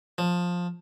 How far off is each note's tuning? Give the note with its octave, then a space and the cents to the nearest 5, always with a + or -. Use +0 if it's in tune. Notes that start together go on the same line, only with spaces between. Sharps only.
F3 +15